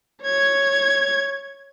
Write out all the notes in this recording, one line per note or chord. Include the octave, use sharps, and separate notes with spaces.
C#5 G#6